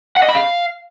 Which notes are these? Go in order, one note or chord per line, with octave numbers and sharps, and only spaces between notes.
F#5
D#5
B5
F5